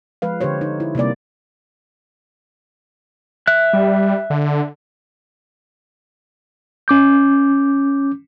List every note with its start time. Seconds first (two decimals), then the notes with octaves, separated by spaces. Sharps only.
0.22 F3 G#3 B4 F5
0.41 D3 D4 G4 C5 C#5
0.61 D#4
0.80 E4
0.95 C3 G3 A#3 D5
3.47 E5 F#6
3.73 G3
4.30 D3
6.88 C#4 D6 G6